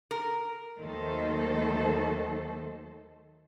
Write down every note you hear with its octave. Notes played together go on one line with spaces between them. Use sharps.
A#4
D#2 D#3 F#3 A3 A4 C5